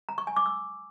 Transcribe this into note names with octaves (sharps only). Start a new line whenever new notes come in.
A#5
C#6
G#5
D6
E6